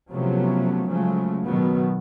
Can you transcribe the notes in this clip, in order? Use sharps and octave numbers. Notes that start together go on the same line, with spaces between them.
C3 F3 F#3 A3 B3 C#4
C#3 F3 F#3 G#3 A3
B2 D#3 F#3 B3